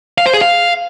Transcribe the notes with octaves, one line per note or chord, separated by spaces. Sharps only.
F5
C5
G#4
F5